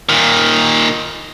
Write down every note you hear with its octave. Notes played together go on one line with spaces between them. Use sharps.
A#2 D#3